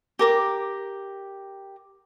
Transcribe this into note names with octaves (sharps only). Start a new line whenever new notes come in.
G4 A#4 D6